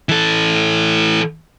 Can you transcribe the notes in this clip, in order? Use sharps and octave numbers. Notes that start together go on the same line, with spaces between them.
E3 A4